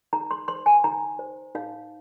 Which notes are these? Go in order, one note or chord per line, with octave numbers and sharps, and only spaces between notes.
D#4 A#5
C6
C5 C6
G#5
D#4 A#5
C5
D#4 F5